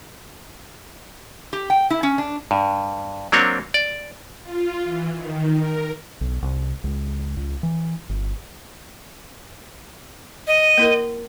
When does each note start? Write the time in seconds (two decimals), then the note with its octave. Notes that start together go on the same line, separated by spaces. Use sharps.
1.53 G4
1.70 G5
1.90 E4
2.03 C#4
2.18 D4
2.51 G2
3.32 F#3 A#3 C4 D4 C#5
3.74 D5
4.42 F4
4.84 E3
5.15 D#3
5.59 A#4
6.21 B1
6.43 C2
6.84 C#2
7.37 C#2
7.63 E3
8.09 G1
10.47 D#5
10.78 A#3 E4 A#4